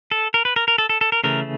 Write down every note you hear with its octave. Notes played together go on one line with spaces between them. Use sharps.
A4
A#4
B4
A#4
A#4
A4
A4
A4
A#4
C#3 E3 A3 A#4